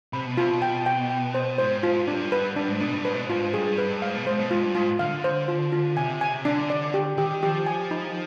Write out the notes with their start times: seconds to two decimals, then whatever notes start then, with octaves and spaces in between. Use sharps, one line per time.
0.13 C3 B5
0.26 B2
0.37 C3 F4
0.49 B2
0.62 G5
0.86 G5
1.10 G5
1.34 C5
1.58 G#2 C5
1.83 F4
2.08 G2 D4
2.32 B4
2.56 G2 D4
2.68 G#2
2.80 B2 D4
2.93 G2
3.05 G#2 B4
3.14 B2
3.24 G#2
3.30 F4
3.54 G2 G#4
3.78 B4
4.02 G#2 F5
4.15 B2
4.27 G#2 C5
4.39 B2
4.50 G#2 F4
4.63 G2
4.75 G#2 F4
4.99 D3 F5
5.24 C5
5.48 F4
5.72 F4
5.96 C3 G#5
6.21 G#5
6.45 D3 D4
6.70 D5
6.94 G4
7.18 D#3 G4
7.43 F3 G4
7.66 G#5
7.91 D#4